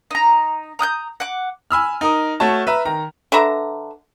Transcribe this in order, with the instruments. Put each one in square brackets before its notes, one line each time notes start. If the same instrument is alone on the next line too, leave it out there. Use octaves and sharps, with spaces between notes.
[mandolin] D#4 A#5
A#5 D#6 F#6 G6
F#5 D6
[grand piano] G#5 B5 E6 F6
D#4 A#4 D#6
A3 F#4 C#5 A5
B4 E5 A#5
D#3 A#5
[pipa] D3 B4 E5 A#5